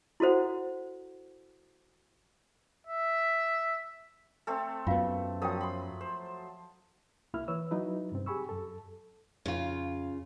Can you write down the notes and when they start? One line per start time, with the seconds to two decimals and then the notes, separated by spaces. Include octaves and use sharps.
0.20 E4 F#4 A4 C5 F#5
2.87 E5
4.47 A3 C4 A4
4.87 F#2 B3 F4 F5
5.42 F3 F#3 A#4 G5 D#6
5.61 B5 C6
6.01 C5
7.34 C2 A#3 E4 E5 F6
7.48 E3 B4 C#5 E6
7.71 F#3 D#4 E4 B4
8.12 G2 C3 C4
8.26 G4 G#4 G#5 B5 C#6 E6
8.49 F#2 A4
9.46 F2 C#3 F4